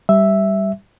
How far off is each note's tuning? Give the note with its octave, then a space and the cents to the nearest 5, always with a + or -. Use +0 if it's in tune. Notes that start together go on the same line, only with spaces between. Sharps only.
G3 +0 E5 +0